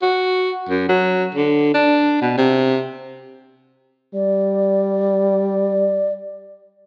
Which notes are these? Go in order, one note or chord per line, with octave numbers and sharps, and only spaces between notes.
F#4
F#2
F#3
D3
D4
B2
C3
G3 D5